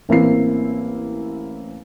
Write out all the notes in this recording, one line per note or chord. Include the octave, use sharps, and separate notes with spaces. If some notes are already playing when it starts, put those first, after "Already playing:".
A1 A#3 C4 E4 C7